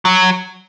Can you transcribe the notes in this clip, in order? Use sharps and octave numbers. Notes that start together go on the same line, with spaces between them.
F#3